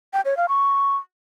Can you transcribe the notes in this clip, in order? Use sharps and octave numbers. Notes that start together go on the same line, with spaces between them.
G5
C#5
F5
C#6